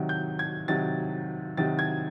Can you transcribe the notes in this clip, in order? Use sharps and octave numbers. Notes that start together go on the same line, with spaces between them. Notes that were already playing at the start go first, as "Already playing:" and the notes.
Already playing: C3 D#3 F#3
G6
G#6
C3 D#3 F#3 A6
C3 D#3 F#3 A6
G#6